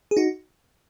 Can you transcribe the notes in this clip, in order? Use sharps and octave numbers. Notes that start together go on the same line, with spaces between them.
G#4
D#4 F#4